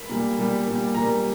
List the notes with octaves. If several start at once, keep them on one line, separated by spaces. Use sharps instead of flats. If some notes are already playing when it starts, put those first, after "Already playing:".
Already playing: B5
A#2 G3 A#3
A#2 G3 A#3
A#2 G3 A#3
A#2 G3 A#3 A#5